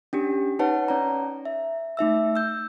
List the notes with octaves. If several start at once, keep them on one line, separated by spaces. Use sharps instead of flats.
C#4 D4 G4
D#4 B4 C#5 F#5 A5
C#4 C#5 D5 A#5
E5
A3 D#4 E5 E6
E6 G6